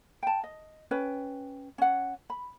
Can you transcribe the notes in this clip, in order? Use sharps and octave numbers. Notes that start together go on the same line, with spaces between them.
G5 A5
D#5
C#4 B4 G5
C#4 F#5
B5